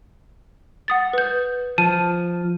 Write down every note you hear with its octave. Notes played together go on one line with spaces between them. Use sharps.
F#5 D#6 A6
B4 G6
F3 A5 D#7